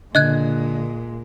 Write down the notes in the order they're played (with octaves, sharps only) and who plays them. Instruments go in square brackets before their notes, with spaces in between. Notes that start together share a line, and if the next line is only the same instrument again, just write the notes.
[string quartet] A#2 G#3 [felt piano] D3 [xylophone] D#5 F#6 G#6